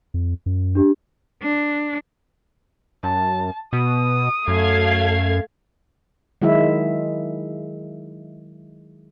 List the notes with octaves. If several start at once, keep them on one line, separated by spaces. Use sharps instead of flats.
F2
F#2
D4 G4
D4
F#2 A5
B2 D#6
F#2 A3 F5 G#6
D#3 F#3 G#3 E4 E5